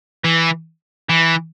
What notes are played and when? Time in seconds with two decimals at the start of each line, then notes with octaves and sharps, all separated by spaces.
0.24 E3
1.09 E3